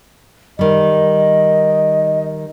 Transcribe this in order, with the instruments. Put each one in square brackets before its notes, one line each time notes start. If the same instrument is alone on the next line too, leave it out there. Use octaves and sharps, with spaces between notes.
[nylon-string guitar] D#3 G3 [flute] D#5